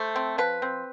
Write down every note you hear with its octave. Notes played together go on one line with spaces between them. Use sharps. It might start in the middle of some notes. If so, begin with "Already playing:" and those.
Already playing: A3 C5
C4
F3 B4
C4